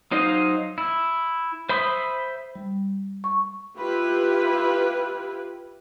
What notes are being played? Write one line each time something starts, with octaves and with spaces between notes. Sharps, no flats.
F#3 D#4 C5 D#5 F5
E4
C5 E5 B5 C6 D#6
G3
C#6
E4 F4 G4 B4